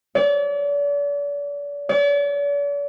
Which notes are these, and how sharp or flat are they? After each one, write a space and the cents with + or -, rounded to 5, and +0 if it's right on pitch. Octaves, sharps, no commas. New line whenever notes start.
D5 -40
D5 -45